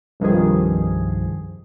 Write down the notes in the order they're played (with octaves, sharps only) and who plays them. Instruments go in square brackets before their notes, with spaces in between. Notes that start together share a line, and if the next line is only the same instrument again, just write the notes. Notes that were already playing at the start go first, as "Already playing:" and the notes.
[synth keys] C2 G2 D#3 F3 G#4